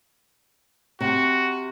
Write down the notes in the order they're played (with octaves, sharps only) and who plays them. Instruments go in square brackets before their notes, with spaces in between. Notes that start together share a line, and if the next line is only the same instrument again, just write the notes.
[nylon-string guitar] C3 [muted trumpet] F#4